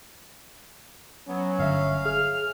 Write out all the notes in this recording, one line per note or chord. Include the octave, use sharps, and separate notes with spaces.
F#3 B3 C#4
G1 E5 F5
G#4 F6